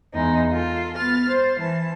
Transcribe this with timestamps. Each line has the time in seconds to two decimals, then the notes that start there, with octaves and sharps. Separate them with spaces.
0.14 E2 G#3 D#4
0.52 F4 A4
0.96 B3 F6 A6
1.28 C5
1.60 E3 A5